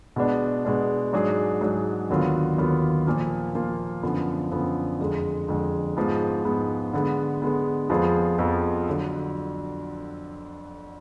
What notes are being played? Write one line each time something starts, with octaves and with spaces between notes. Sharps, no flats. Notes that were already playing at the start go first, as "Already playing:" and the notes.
B2 G#3 B3 D4
B2 G#3 B3 D4
G#2 F#3 D4 G#4
G#2 F#3 D4 G#4
D#2 D3 F#3 B3 F4
D#2 D3 F#3 B3 F4
A#2 F3 A#3 F4
A#2 F3 A#3 F4
F#2 D3 F3 B3
F#2 D3 F3 B3
F2 D3 G#3
F2 D3 G#3
G#2 F3 G#3 B3
G#2 F3 G#3 B3
D3 G#3 B3
D3 G#3 B3
F2 F3 B3 F4 G#4
F2 F3 B3 F4 G#4
D3 F#3